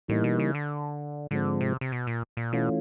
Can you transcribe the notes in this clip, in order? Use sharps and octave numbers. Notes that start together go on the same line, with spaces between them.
A2 E3 G3 A#3 D#4
B2
C#3
D3
G#2 D3 F3 G#3 C4
C3
C3
B2
A#2
A#2
B2 E3 A3 C#4 F4